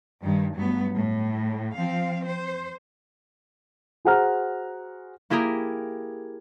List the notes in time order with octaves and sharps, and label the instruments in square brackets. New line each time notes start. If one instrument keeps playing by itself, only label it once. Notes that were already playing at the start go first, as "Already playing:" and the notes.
[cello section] G2 D#3
G2 F#3 A3 B3
A2
F3 C4 F5
C5
[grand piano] F#4 G#4 C5 F#5 A#5 F6
[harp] A#3 E4 G4 G#4 A#4